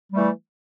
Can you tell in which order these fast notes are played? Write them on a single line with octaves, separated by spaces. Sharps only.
G3 A3 E3